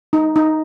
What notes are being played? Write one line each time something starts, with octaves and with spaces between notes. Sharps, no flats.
D#4
D#4